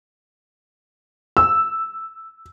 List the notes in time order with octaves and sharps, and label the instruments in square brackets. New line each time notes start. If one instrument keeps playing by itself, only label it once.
[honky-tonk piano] E6